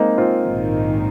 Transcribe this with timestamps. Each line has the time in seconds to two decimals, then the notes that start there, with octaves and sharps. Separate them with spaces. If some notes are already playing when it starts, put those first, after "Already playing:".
Already playing: G#3 A#3 C4 D#4
0.18 C4 F4
0.42 A#1 G#2 D#3